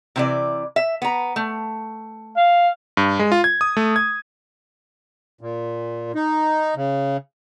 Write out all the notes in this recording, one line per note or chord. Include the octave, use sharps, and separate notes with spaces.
C3 E3 D5
E5
B3 A#5
A3
F5
G2
G#3
F4
G#6
D#6
A3
G#6
A#2
D#4
C#3